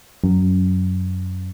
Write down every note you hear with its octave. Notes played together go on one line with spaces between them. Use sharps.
F#2